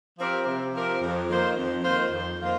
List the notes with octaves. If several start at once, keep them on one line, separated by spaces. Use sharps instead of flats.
F3 C4 G4 A#4
C3
F3 C4 G4 A#4
F2
D#3 A#3 F4 C5
F2
D#3 A#3 F4 C5
F2
D#3 A#3 F4 C5